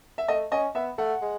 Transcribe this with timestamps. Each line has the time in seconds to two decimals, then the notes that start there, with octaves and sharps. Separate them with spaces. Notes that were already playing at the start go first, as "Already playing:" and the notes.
0.18 E5
0.28 A3 D#5
0.52 C#4 D#5
0.75 B3 E5
0.98 A3 F#5
1.22 G#3